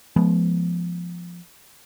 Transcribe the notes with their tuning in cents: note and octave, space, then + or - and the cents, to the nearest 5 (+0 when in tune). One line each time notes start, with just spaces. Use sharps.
F3 +0 G#3 +30 B3 -10